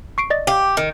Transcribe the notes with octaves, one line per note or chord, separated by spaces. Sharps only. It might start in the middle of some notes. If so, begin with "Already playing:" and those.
C#6 C7 D7
D5 D#5 A6
G4 F5
D#3